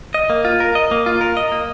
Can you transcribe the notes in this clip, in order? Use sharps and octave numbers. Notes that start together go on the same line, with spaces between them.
D#5
A#3
F4
A#4
D#5
A#3
F4
A#4
D#5
A#3